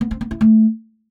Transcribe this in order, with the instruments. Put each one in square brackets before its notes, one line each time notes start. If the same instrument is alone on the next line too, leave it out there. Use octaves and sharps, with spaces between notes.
[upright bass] B3
C4
B3
E4
A3